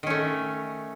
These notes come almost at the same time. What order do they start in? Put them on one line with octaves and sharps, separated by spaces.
D#3 C#4 A3